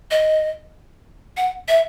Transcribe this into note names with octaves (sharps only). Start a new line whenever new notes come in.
D#5
F#5
E5